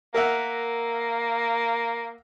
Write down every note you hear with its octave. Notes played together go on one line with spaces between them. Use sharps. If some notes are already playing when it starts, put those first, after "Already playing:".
A#3 A#4 E5 F#5